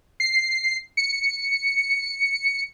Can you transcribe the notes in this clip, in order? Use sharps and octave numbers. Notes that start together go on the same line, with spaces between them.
C7
C#7